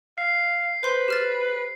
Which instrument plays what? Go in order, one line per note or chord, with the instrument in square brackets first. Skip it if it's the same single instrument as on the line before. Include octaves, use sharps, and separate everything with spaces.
[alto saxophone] F5 [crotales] C7
[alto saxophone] B4 [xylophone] C5 C6 G6
[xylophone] G4 F6 A6